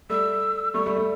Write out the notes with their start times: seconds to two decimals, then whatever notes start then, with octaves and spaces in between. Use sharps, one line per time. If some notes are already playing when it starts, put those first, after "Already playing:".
0.10 G3 A3 E6
0.74 G3 A3 C#6
0.86 G3 A3
0.96 G3 A3